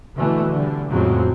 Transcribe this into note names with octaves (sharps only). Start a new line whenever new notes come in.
B2 D3 E3 A3
D3 G3
F2 A2 C#3 F#3 G#3 C4